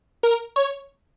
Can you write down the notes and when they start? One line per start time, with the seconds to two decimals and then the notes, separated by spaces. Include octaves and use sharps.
0.23 A#4
0.56 C#5